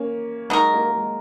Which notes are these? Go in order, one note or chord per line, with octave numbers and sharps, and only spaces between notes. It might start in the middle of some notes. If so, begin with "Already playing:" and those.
Already playing: A#3 C#4
F#3 G#3 D#4 A#4
A#3
A#3
G#3